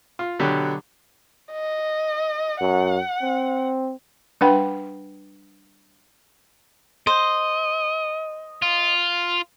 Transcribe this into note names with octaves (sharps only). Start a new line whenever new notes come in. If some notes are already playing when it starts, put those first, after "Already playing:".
F4
B2 D3 F#3 G4
D#5
F#2 F#5
C4
G3 D4 B4 F#5 G5 B5
C5 D#5
F4